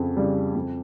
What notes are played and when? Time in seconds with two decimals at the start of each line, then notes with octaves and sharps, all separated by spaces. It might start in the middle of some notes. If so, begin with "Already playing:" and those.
Already playing: F2 C#3
0.17 C#3 G3
0.56 F2